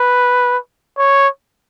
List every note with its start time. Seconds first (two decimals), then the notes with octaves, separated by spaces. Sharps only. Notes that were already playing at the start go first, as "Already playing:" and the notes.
Already playing: B4
0.97 C#5